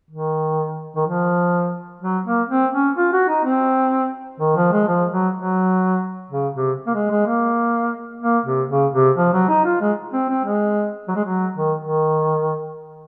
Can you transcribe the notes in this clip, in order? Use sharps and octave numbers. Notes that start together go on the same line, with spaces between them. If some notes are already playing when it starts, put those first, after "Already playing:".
D#3
D#3
F3
F#3
A#3
C4
C#4
F4
F#4
D#4
C4
D#3
F3
G#3
F3
F#3
F#3
C#3
C3
A#3
G#3
G#3
A#3
A#3
C3
C#3
C3
F3
F#3
D#4
F4
G#3
C4
C4
G#3
F#3
G#3
F#3
D#3
D#3